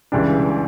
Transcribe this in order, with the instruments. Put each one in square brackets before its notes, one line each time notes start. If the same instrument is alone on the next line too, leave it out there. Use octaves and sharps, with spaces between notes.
[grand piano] C#2 C#3 E3 G3 D4